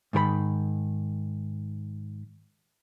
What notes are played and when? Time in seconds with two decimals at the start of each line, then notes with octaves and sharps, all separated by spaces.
0.13 G#2 D#3 A#4 B5